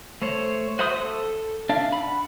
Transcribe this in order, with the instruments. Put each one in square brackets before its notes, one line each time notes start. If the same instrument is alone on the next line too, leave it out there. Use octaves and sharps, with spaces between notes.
[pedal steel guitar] A3 C5 C#5
F#4 C5 E5 C6 D#6
A4
D4 E5 F5
F#5 B5